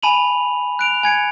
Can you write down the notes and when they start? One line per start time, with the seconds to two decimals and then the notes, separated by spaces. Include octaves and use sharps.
0.03 G#5 A5 B5 D#7 F7 F#7
0.79 F#6 D7 F7
1.03 G#5 G#6 C#7 D7